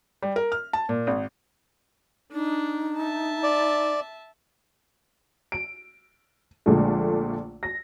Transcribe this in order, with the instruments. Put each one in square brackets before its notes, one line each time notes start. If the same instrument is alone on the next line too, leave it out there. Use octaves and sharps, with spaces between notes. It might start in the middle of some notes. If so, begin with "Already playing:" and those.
[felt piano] G3
A#4
F6
A5
A#2
G#1
[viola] D4 [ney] D#4
[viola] E5 A5
[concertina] D5
[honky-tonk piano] D7
A#1 A#2 D3 G#3 A3
A#6